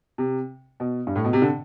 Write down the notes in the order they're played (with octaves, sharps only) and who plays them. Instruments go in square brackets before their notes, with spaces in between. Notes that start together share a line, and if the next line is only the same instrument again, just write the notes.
[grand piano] C3
B2
G2
A2
B2
C3
D3